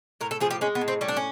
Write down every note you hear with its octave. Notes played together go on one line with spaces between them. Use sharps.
A2 A#4
A4
F3 G#4
G4
G#3 C#4
B3
A2
C4
G3 C#4
D4
C#4